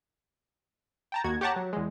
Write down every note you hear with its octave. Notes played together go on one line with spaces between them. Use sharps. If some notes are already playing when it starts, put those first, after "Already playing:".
G5 A5 A#5
D#2 F#4 G#6
G4 C#5 F#5 A5 A#5
F#3
E2 G#3